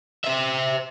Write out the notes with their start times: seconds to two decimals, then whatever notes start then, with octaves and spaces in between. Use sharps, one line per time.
0.25 C5 E5